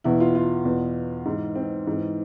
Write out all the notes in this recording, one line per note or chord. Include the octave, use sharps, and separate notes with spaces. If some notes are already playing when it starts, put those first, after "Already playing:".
E2 B2 E4
F4
F4
E2 B2
G#2 E3
C4
G#2 E3